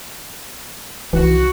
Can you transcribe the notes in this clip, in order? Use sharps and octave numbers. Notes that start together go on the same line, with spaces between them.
C2 E3 D#4 F#4